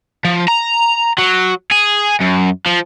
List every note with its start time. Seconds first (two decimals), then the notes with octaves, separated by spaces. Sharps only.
0.25 F3
0.48 A#5
1.18 F#3
1.72 G#4
2.21 F#2
2.66 F3